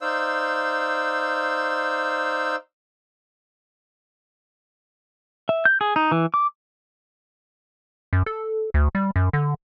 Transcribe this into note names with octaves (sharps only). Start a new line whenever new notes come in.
D#4 C5 D5 F5 E6
E5
G6
G#4
D#4
E3
D6
F#2
A4
D2
G3
F#2
D3